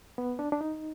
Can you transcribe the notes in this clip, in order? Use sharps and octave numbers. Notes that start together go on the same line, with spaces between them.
B3
D4
D4
D#4